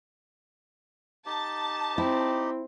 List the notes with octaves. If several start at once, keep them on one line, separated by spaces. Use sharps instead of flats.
D#4 G4 A5
C4 E4